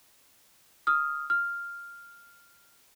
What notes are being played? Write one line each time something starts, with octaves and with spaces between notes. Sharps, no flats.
D#6 F6
F6